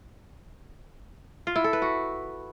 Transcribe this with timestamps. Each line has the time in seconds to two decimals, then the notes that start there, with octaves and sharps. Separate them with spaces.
1.47 F4
1.56 E4
1.64 A4
1.73 B4
1.82 F#4